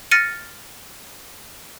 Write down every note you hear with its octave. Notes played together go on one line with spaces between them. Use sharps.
F6 A6 A#6 C#7 D#7